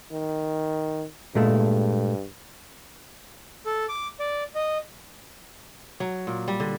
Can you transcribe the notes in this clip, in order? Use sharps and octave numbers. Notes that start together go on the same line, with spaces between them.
D#3
G2 A#2 G#3 A3
A4
D6
D5
D#5
F#3
A#2
G3
D3